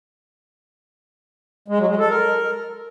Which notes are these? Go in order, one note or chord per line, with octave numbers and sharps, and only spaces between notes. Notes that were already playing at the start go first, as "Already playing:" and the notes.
G#3
F#3
G#3
A4
A#4